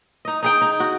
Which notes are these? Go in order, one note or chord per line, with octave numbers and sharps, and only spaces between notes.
D#4 D#5
D#4 G#4 G5
D#4
F#4